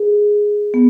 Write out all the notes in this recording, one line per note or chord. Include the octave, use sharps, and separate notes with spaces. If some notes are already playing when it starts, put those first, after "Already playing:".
Already playing: G#4
B3